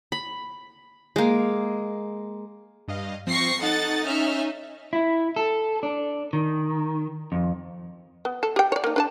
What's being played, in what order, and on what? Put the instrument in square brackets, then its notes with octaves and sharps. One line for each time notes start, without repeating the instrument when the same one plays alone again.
[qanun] B5
G#3 A#3
[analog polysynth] G2 D#5 F5
[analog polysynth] F3 C4 [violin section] C#6 A#6 C7
[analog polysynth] D#4 D#5 [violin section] A4 F#5 A6
[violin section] C#4 E5 F6
[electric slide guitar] E4
A4
D4
D#3
F2
[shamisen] B3
A4
G4 G5
C#5 D5
A#3 D#4
D4 B4 A5